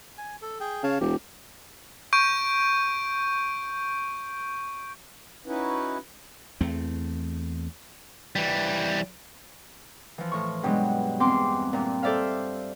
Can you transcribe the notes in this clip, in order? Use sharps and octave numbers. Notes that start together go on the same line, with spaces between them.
G#5
A4
G#4 G5
C#3 C#5 F5 A5
E1 G4
C#6 G6 D7
C#4 D#4 E4 F#4 B4
E2 A3 C4
E3 G3
E3 F3
A2 C#6
G2 B2 F#3 G#3
E2 C4 C6 D6
G2 A#2
A4 C5 D5 E5 F5